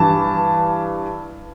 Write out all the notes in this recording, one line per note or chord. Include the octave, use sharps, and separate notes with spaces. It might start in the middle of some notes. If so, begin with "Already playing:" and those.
Already playing: G2 E3 A5